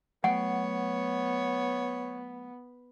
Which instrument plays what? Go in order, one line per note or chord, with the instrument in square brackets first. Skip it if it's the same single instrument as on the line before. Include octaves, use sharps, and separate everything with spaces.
[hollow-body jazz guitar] F#3 A3 G5 [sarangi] B3 [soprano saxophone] C#5 [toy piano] F#5